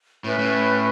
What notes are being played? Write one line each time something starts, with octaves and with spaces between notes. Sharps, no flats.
A2 C#4 E4 B4 E5
A2